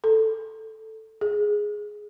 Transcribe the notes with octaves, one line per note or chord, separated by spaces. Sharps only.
A4
G#4